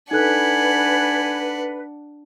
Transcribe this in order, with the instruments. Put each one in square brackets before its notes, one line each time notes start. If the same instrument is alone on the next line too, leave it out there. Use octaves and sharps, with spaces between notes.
[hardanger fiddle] D4 F#5 [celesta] D#4 A4 F#6 [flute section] B4 [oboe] G#5